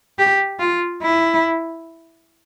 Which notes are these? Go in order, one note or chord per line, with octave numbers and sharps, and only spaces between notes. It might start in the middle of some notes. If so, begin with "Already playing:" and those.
G4
F4
E4